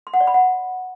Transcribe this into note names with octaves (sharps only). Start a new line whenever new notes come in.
C6
F#5
D5
B5
F#5